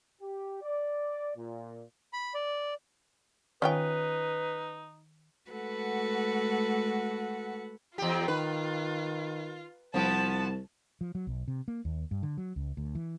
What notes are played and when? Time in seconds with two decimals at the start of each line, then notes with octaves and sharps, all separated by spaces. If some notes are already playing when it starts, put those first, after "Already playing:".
0.22 G4
0.63 D5
1.36 A#2
2.13 B5
2.34 D5
3.62 D#3 C#4 D#4 F4 B4 G5
5.49 G#3 A3 F#4 A4 B4 F#5
7.98 E2 F4 G4
8.28 D#3 B4
9.94 C2 F3 B3 A5
11.01 F3
11.15 F#3
11.27 B1
11.48 C3
11.68 A#3
11.85 D#2
12.11 G2
12.23 D3
12.38 F#3
12.56 C#2
12.77 D2
12.95 E3